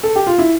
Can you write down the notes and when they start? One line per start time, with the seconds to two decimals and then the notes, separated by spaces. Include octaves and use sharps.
0.03 A4
0.16 G4
0.27 F4
0.38 E4